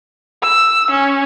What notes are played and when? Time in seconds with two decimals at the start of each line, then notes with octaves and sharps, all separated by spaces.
0.42 E6
0.90 C#4